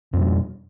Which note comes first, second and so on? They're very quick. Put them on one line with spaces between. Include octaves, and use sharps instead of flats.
F2 B2 G3